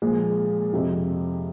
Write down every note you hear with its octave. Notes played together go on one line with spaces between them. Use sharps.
A#2 F3 G#3
F2 C3 F3